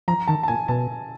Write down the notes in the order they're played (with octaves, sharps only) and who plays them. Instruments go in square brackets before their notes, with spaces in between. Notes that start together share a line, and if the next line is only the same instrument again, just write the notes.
[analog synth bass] F3 [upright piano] A#5
[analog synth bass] D#3 [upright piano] A5
[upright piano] A5
[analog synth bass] A#2 [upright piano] G#5
[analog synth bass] B2 [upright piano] A5